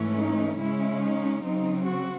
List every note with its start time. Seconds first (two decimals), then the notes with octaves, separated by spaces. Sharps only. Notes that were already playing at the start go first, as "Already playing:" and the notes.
Already playing: G#2 E3 A3 C#4
0.16 D#4
0.58 C#3 G#3 C#4 E4
1.01 D#4
1.43 C#3 F#3 C4 D#4
1.85 F#4